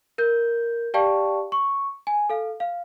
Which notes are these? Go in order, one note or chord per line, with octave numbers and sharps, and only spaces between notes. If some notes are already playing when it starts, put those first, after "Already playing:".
A#4 G6
G4 D5 F5 G5 A5 C#6
C#6
G#5
A4 F5
F5